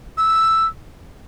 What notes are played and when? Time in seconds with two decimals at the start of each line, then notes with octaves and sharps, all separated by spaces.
0.18 E6